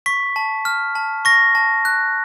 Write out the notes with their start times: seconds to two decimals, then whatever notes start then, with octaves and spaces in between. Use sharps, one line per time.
0.06 C#6 B6
0.36 A5
0.65 F6
0.95 A5
1.25 C#6 A#6
1.55 A5
1.85 F#6